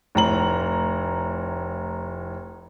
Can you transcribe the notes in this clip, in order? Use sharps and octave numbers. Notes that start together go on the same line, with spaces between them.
F1 A2 A#5 F#7